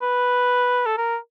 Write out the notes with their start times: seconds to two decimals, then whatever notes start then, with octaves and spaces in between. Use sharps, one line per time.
0.02 B4
0.86 A4
0.97 A#4